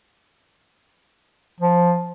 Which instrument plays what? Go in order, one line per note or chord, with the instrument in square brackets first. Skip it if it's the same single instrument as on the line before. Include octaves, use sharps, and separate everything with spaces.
[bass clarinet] F3